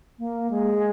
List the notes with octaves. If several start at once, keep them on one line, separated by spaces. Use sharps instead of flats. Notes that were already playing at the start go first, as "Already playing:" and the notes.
A#3
G#3